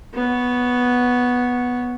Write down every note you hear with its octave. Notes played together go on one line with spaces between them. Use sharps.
B3 C#5